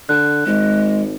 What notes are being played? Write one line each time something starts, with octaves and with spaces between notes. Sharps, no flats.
D3 F#6
G#1 G#3